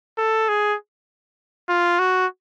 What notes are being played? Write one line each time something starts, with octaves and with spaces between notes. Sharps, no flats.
A4
G#4
F4
F#4